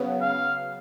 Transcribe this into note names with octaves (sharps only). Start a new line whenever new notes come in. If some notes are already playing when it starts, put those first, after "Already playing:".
Already playing: C#3 F#3 B3
F5